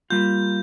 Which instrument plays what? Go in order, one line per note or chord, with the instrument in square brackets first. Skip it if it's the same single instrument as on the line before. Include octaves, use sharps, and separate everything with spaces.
[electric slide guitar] G3 A#3 F4 [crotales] G6